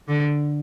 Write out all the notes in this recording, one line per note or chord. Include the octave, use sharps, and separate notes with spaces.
D3